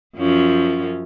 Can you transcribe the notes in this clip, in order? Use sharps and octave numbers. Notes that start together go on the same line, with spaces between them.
F#2 F3 C#4